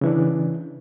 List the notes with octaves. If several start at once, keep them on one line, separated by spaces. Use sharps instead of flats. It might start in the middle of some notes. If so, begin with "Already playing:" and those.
C#3 E3 D4